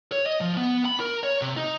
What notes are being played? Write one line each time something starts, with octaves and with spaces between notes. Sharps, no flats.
C#5
D#5
F3
B3
B5
A#4
C#5
C3
D#4